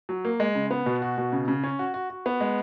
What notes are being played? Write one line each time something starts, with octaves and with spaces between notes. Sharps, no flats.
F#3
A#3
G#3
C#3
B3
B2
F#4
B2
C#3
C#3
C#4
F#4
F#4
F#4
B3
G#3